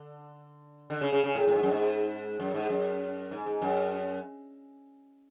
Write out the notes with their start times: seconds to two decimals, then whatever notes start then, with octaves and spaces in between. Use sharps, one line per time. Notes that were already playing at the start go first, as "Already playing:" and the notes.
Already playing: D3
0.90 D3
1.01 C#3
1.13 C#3
1.24 C#3
1.35 A2
1.48 A2
1.55 G#2
1.63 F#2
1.71 G#2
2.40 F#2
2.54 G#2
2.69 F#2
3.31 G#2
3.46 G#2
3.62 F#2